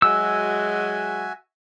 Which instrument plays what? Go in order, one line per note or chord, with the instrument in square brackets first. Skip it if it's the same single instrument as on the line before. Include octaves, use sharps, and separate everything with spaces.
[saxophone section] F#3 G#3 [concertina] F#4 E5 G#5 [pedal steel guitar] E6